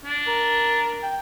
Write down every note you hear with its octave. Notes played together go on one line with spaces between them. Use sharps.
D4
A#4
G5